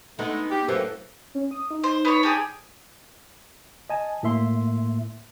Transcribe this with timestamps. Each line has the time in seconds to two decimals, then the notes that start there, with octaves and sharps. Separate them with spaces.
0.19 G#3 A3 B3 D#4
0.51 G4
0.68 F#2 A2 E3 F3 A#3 A4
1.35 C#4
1.51 D#6
1.71 D#4
1.84 C5
2.05 B3 C5 C#5
2.23 D4 G4 G#4
3.90 D#5 G#5 A5
4.23 A2 A#3 E5 C6